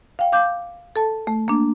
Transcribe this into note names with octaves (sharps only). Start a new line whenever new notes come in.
F5 G5
F5 D6 G6
A4 A5
A3
A#3 D4